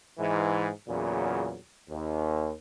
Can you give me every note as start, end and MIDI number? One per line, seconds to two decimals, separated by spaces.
0.19 0.69 44
0.19 0.69 52
0.88 1.58 40
0.88 1.58 46
0.88 1.58 49
0.88 1.58 54
1.90 2.52 39